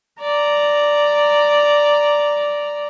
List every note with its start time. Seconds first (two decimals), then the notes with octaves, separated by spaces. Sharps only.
0.21 D5 A#5